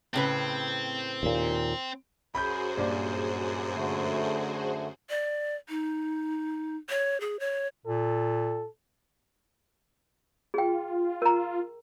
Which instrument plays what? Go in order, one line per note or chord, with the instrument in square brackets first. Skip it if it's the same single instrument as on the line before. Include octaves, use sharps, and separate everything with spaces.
[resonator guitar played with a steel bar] A2 C#3 B4 [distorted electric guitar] C4
[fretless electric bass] D#2 A#2
[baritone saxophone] F#2 [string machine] F#4 G#4 C5 [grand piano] B5 G6
[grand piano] G2 A#2 D5
[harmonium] D3 A3
[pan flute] D5
D#4
C#5
G#4
C#5
[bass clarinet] A#2 [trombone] A4
[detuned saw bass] F4 [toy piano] G#4 G5
[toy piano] A#4 A#5